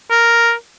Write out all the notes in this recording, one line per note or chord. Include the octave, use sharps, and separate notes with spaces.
A#4